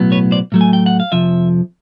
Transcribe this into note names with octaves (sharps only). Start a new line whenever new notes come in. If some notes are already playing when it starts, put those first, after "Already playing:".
Already playing: B1 A2 F#3 B3
B4 C#5
C5 D5
A2 F#3 A3
G#5
G5
F#5
F5
F2 C3 F3 E5